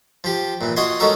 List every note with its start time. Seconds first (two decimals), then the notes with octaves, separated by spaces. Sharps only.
0.24 F3 G4
0.61 A#2 E3
0.76 F4 F#4 D#5 F#5 G#5 C6
1.00 G#3 C#4 D#4 F#4 A4 A#4